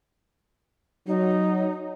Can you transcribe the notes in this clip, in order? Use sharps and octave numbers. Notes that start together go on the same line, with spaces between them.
F#3 D#4